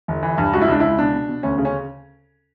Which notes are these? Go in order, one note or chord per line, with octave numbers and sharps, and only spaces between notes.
G1
E3
G2
C#2 F#4
E4
C#2 D4
C#2 E4
B2 D4
B2
B2
D2 C#4
C#3
C#4